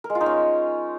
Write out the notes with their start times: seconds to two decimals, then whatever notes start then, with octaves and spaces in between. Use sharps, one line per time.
0.04 A#4
0.10 G#3
0.15 F4
0.21 D#4
0.26 C#4